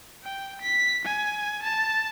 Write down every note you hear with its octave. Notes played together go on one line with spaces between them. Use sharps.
G5
B6
G#5
A5